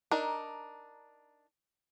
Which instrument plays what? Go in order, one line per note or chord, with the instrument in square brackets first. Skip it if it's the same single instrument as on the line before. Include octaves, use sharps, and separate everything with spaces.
[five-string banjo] D4 D#4 A#4